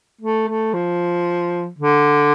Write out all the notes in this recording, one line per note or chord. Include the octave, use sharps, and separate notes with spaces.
A3
A3
F3
D3